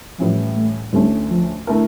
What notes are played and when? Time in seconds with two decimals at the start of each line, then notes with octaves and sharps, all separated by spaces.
0.19 A2 E3 F3 G3 C#4 E4
0.56 A3
0.93 D2 D3 G3 A3 C#4
1.30 F3
1.67 D3 A3 E4 A#4